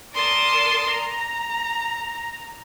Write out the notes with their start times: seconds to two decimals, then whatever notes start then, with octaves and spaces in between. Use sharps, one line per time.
0.14 A#4 D5 A5 C6 D#6
0.89 A#5